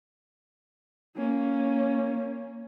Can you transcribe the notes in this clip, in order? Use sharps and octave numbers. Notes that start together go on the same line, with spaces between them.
A#3 C#4